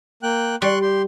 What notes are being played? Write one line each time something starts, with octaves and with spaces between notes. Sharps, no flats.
A#3 G5 F#6
G3 C6 C#6 F#6
G4 C6